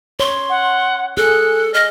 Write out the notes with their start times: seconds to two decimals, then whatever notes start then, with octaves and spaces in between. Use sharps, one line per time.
0.20 C#5 C6
0.50 F#5
1.17 G#4 A4 F#6
1.74 D#5 F6